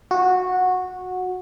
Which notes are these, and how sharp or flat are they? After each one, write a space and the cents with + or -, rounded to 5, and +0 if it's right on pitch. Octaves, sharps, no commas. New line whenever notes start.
F#4 -15